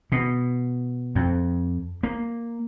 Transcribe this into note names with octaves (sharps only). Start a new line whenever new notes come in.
B2
F2
A#3